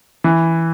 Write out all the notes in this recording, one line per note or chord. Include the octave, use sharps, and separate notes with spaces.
E3